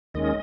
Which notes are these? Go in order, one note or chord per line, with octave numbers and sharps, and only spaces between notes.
D#2 D#3 G#3 C#4 D#5